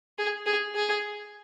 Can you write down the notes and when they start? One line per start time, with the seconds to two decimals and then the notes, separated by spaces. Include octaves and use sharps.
0.19 G#4
0.46 G#4
0.75 G#4